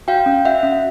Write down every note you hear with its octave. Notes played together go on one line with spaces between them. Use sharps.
F#4 F5 G5
C#4
F#4 E5 F#5
C#4